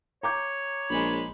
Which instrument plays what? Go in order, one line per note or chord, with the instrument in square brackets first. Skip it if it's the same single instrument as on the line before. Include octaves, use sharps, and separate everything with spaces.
[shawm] C#5 [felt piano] A#5 D6 G6
[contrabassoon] A#1 [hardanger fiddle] G#3 B5